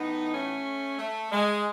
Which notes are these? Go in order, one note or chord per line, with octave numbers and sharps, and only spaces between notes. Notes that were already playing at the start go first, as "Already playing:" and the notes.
Already playing: A2 E3 B3 D#4
A3 C#4
A3
G#3